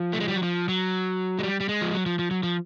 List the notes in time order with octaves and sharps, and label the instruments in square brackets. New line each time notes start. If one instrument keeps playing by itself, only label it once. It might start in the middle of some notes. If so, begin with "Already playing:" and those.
Already playing: [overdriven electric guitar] F3
A3
G#3
G3
F#3
F3
F#3
G#3
G3
G3
G#3
F3
F#3
F3
F3
F#3
F3